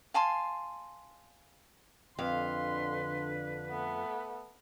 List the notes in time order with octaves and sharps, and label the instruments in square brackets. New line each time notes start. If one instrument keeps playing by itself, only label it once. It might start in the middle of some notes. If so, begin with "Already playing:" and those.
[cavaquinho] F5 G#5 A5 C6
[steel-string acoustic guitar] F2 F5 [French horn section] D3 [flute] B4 [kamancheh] C6
[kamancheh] A3 B3